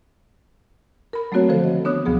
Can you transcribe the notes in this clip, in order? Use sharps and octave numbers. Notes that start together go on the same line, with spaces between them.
A#4 B5
F#3 A3 A#3 C4 F#4 C#5
D3 D#3 F3 A4 C5
D#5
B3 D4 C#5 D#6 F#6
D2 C3 F3 F#3 B3 G#4